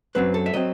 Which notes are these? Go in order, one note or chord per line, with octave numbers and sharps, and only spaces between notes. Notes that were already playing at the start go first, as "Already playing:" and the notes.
F#2 F#3 C4 B4
A4
E5
F#3 C4 D#5